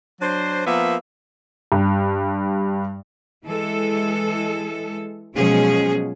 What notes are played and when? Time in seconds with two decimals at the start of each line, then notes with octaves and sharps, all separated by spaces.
0.21 F#3 D4 C5
0.66 F3 A#3 B3 A#4 E5
1.72 G2
3.45 E3 G#3 A4
5.36 B2 F3 F#3 G#3 C#4 G#4